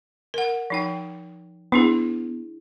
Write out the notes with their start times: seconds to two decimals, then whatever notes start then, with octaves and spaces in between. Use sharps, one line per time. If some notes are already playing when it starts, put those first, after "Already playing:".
0.34 A#4 F#5
0.70 F3 D#4 G5
1.72 B3 D4 E4 G#4